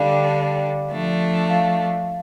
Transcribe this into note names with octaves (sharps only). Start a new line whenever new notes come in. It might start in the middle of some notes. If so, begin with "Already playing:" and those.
Already playing: D3 G3 D4 D5 F5
G5
F3 A3 D4
F5